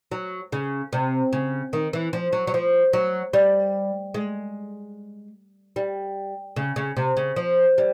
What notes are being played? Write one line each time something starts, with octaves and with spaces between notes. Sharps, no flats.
F#3
C#3
C3
C#3
D#3
E3
F3
F#3
F#3
F3
F#3
G3
G#3
G3
C#3
C#3
C3
C#3
F3
G3